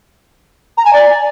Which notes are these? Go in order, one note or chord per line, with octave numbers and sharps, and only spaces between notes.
A#5
G#5
D5